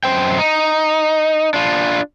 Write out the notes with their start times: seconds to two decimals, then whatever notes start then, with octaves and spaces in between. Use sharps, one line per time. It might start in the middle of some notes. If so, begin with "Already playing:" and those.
0.04 F#2 C5 G5
0.38 D#4
1.54 D4 F4